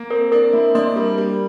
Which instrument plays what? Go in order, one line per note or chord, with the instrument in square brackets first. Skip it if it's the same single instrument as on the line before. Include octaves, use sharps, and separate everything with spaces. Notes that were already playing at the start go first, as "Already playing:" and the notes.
Already playing: [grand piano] A#3
[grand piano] C4 [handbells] A#4
[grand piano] D4 [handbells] A#4
[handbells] A#3 [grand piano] E4
[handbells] A#3 [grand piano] D4
[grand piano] G3 [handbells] A#4
[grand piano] G3 [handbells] A#4